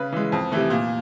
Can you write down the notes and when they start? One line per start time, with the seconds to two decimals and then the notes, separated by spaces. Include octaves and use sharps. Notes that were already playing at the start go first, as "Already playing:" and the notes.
Already playing: C#3 B4
0.12 E3 G#3
0.32 F2
0.52 C3 E3 A3
0.70 A#2